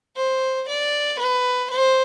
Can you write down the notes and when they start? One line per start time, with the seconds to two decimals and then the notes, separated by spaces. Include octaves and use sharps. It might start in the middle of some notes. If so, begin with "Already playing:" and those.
0.16 C5
0.68 D5
1.19 B4
1.70 C5